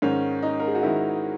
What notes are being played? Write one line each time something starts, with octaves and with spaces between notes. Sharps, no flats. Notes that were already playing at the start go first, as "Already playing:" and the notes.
G#2 D#3 C#4
D#4
A#4
G#4
F#4
G#2 D#3 E4